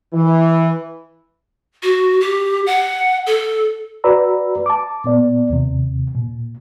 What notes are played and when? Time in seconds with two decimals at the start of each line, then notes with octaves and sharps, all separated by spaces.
0.13 E3
1.83 F#4
2.21 G4
2.66 F#5
3.27 A4
4.04 F#4 B4 D5 A#5 B5 E6
4.66 A5 D6
5.04 A#2 B3 D5
5.50 D#2 C3
6.15 A#2